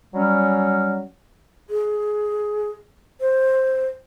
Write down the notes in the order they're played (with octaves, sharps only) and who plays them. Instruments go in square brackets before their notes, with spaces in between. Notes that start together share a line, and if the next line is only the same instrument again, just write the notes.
[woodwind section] F#3 G3 C#4
[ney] G#4
C5